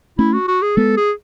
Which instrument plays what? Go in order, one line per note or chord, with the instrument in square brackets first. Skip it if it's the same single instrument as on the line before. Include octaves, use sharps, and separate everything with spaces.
[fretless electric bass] A3 C#4 [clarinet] E4
[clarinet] F#4
F#4
G#4
[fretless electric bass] G#3 B3 [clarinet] A4
[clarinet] G#4